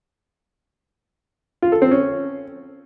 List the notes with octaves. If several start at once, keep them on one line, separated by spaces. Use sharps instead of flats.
F4
A4
C4
C#4